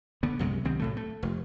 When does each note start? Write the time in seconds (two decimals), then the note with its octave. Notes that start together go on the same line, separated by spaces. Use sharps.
0.23 D3 B3
0.39 C2 F#2 C3 G#3
0.65 C2 D#3 C4
0.79 B1 A2 A3
0.97 A3
1.23 F1